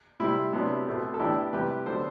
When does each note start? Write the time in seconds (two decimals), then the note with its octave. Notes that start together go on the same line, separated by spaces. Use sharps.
0.20 C3 G3 C4 E4
0.53 C3 F#3 B3 D4
0.87 B2 A3 C4
1.14 A4
1.20 A2 E3 B3 D4 E4 G4
1.53 C3 E3 G3 G4 B4
1.86 D3 F#3 B3 D4 A4 C5